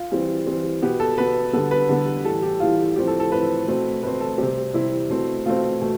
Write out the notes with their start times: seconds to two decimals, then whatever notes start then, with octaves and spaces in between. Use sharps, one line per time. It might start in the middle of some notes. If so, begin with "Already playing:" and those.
Already playing: F4
0.11 E3 G3 C4
0.46 E3 G3 C4
0.82 B2 B3 G4
1.00 A4
1.18 B2 B3 B4
1.53 D3 G3 B3 A4
1.71 B4
1.89 D3 G3 B3
2.24 A2 E3 G3 A4
2.42 G4
2.60 A2 E3 G3 F4
2.96 A2 F3 C4 G4
3.07 A4
3.20 A4
3.31 A2 F3 C4 B4
3.67 B2 A3 C4
4.03 B2 A3 C4 B4
4.21 A4
4.38 C3 G3 C4 G4
4.74 C3 G3 C4 E4
5.10 B2 A3 C4
5.45 B2 A3 C4 F4
5.81 B2 A3